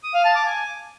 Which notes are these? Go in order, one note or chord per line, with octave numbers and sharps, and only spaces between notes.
D#6
F5
A5
D6
G#5